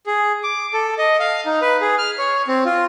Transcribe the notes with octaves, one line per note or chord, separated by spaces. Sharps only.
G#4
D6
A4
D#5
F5
D#4
B4
G#4
F6
C#5
C4
F4